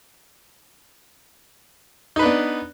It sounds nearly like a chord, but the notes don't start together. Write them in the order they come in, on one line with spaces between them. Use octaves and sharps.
D#4 B4 D4 B3